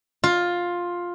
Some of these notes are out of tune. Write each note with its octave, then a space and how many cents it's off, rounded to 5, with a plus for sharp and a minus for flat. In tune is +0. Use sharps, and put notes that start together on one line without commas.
F4 +10